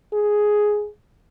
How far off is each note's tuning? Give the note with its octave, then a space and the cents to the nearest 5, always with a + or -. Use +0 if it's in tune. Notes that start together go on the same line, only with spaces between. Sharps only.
G#4 +5